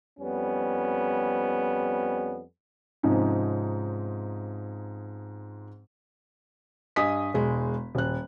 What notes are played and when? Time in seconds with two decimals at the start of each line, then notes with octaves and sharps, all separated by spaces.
0.20 F2 G3 B3 C#4
3.03 G#2 C3 F3 C#4 D#4
6.96 G2 D#5 G#5 D#6 B6
7.34 E1 G#3
7.95 D#1 F#6